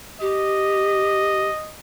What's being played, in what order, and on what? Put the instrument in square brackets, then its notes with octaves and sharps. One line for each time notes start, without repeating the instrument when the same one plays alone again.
[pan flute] G4 [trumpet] D#5